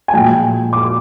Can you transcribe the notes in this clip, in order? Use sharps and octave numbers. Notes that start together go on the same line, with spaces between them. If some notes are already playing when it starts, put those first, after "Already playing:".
G#5
A#2 F3 G#3 G5
D6